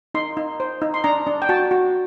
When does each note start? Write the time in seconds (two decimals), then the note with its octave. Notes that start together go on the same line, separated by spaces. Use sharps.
0.15 D#4 C6
0.37 D#4
0.60 C5
0.82 D#4
0.94 C6
1.04 D4 A#5
1.27 D4
1.42 G5
1.49 F#4 A5
1.71 F#4